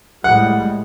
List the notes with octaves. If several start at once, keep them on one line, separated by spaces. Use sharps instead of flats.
A2 G3 G#3 F#5